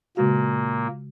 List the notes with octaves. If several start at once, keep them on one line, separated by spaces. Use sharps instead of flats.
A#2 C#3 G#3 A#3 F#4